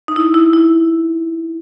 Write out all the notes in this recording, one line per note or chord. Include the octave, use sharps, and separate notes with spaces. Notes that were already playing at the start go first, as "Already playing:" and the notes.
D#4
E4
E4
E4